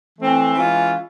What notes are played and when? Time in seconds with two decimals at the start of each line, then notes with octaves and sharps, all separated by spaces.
0.19 E3 A3 C4
0.55 E3 G#3 C#4 F4